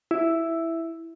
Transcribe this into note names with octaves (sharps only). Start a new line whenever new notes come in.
E4